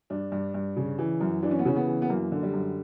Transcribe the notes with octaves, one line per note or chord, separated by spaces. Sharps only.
G2 D4
G2
G2
C#3
E3
F#2
E3 D4
C#4
B3
C#3 C#4
B3
E3
B3
F#2 A#3
D3
G3
F#2